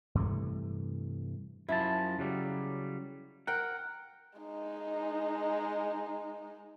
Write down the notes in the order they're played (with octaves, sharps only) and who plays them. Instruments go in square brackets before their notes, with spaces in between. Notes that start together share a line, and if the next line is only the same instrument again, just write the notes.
[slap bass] G2 C3 E3 A3
[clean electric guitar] F#2 F3 A5 [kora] E4
[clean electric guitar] C#3 F#3 G3
[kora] A#4 G5 [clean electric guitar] F#5
[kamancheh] G#3 D#4